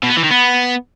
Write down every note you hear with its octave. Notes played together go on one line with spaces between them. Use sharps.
B2
B3
E3
D#3
B3